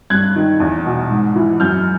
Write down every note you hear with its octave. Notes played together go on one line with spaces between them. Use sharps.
G2 F#6 G#6
D#3
E2
B2
G#2
E3
F#2 F6 G6